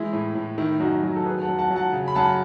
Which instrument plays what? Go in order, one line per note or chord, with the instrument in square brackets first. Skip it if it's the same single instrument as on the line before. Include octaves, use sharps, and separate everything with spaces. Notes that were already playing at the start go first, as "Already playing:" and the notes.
Already playing: [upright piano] E3 G#3 E4
A2
A2
D#3 E4
F#2 D#4 F#4
F#3
A4
D#3 G#4 B4
F#5 A5
F#2
F#5 A5
F#3
F#5 A5
C#3
B5
F#2 F#5 A5